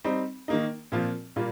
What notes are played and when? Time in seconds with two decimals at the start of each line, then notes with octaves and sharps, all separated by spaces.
0.04 G3 C4 D#4
0.48 D#3 A#3 D#4
0.92 A#2 F3 C4 F4
1.36 A#2 G3 A#3 F4